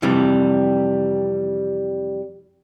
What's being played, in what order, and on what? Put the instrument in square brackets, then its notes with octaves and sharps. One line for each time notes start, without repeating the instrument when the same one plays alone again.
[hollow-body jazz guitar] F2 C3 E3 G3